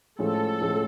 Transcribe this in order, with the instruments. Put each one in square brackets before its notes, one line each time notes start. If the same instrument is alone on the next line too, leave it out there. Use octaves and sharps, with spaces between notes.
[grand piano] A2 F3 G#3 C#4 [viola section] A4
[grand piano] A2 F3 G#3 C#4